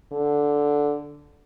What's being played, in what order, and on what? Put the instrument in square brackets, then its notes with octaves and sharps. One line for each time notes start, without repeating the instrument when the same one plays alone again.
[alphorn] D3